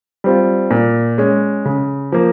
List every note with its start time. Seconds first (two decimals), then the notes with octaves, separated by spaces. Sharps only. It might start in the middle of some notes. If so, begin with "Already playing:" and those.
0.24 G3 C4 F4
0.71 A#2
1.18 G#3 C#4
1.65 C#3
2.12 F3 A#3